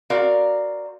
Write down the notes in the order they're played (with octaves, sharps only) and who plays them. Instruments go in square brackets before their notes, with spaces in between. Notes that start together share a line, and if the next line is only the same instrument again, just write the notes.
[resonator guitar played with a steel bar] C4 F#4 A#4 D5 F5